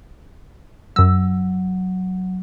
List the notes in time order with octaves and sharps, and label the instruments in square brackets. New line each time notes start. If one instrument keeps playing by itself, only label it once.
[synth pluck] F#2 E6 [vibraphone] F#3